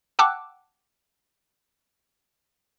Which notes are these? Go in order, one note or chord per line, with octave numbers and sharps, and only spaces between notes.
F#5 G5 A5 D6 E6 F#6